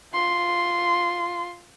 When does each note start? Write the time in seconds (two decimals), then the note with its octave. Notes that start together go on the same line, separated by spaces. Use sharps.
0.14 F4 C6